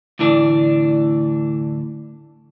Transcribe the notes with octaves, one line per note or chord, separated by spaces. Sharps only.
D2 A2 E3 D4